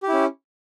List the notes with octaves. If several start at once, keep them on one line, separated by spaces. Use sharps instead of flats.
C#4 E4 G4